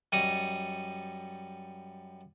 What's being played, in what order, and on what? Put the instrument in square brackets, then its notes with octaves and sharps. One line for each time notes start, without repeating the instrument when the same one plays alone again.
[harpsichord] F#2 G3 D#5 C#6 D#6